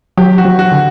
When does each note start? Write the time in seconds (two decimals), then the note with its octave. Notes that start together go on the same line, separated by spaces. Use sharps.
0.17 F#3 G4
0.38 F#4
0.45 F#3
0.59 F#4
0.72 D3